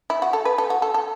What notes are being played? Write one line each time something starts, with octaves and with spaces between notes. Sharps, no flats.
E4
F#4
A4
B4
A4
F#4
A4
A4